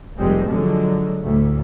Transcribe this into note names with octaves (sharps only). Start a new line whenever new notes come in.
F1 G3 G#3 C4
D3 F3 F#3 G#3
D2 A2